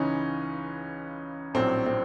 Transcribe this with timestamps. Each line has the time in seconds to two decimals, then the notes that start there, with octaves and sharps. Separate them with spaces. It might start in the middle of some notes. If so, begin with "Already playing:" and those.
Already playing: C#2 C#3 E3 C#4 D#4
1.54 A#1 A2 F#3 C4
1.86 C4